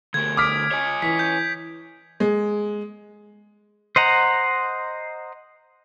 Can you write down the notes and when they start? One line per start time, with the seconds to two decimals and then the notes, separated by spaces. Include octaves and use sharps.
0.14 D3 A3 A#4 G#6
0.37 D6 D#6 F6 B6 D7
0.71 C#5 D#5 G#5
1.02 E3 B6
1.19 G6
2.20 G#3
3.96 C5 D#5 F#5 A#5